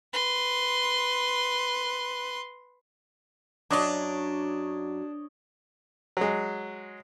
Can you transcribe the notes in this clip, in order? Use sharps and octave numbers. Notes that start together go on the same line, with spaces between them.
B4 C6
F#2 F#3 D4 C#5 D#5 D6
F#3 G#3